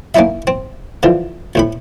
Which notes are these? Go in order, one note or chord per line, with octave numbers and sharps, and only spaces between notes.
A#3 C#4 D#4 E4 E5
C4
D3 E3 F3
D2 A2 B5